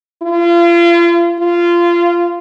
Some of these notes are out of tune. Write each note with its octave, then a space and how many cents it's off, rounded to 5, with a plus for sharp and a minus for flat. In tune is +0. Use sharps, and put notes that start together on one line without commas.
F4 -35
F4 -20